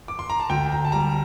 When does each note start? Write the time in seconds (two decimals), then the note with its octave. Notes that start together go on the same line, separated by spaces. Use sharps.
0.08 D6
0.19 C6
0.30 A#5
0.40 A5
0.49 D2 G5
0.72 A#5
0.85 A5
0.92 G3 A#5